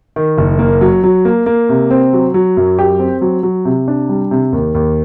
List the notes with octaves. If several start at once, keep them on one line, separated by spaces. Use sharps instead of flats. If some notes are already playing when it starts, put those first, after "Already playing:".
D#3
F#1
A#3
F#3
F#3
A#3
A#3
C3
C4
F#3
F#3
F#2
G4
C4
F#3
F#3
C3
D4
G3
C3
D#2
D#2